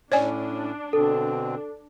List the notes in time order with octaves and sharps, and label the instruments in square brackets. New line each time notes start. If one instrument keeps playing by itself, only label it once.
[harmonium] A2 C#4 [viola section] D4 [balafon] C#5 D5 G#5
[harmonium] B2 D3 C4 [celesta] A4